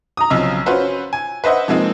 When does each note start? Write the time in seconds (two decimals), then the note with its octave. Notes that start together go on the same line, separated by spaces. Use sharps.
0.17 A#5 D#6
0.30 B1 C#3 F3 C4 D#5 E6
0.66 C#4 F4 F#4 B4 C5
1.13 G#5
1.44 B4 C5 D#5 E5 F#5
1.68 F3 G#3 A#3 C4 D#4